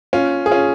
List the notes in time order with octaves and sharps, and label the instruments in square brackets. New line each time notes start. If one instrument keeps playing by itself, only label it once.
[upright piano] C#4 F4
G#4
C#4 F4